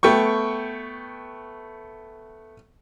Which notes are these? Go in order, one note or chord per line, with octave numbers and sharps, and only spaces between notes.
A3 B3 G5 C#6